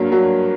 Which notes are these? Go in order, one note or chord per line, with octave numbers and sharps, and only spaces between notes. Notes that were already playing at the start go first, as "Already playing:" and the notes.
Already playing: G2 F#3 A#3
F#3